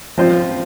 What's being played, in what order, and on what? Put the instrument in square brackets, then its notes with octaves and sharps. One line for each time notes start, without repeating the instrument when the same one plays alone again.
[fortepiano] F3 C4 F4 C5